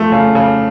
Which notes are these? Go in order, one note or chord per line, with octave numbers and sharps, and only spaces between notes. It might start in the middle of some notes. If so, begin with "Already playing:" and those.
Already playing: F3 A3
C#3
C#3